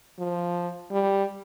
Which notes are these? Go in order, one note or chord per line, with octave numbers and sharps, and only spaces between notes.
F3
G3